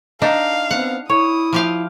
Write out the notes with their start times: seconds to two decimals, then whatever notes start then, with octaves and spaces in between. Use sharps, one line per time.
0.22 D4 D#4 F5
0.71 B3 C4 F#5
1.09 E4 C#5 D#6
1.53 F3 G4 F5